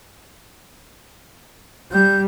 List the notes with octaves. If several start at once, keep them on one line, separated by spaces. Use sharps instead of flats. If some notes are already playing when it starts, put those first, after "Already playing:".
G3 G6